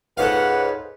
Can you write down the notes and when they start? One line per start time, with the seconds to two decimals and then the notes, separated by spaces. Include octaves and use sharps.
0.17 C#2 G#2 A4 B4 C#5 F5 F#5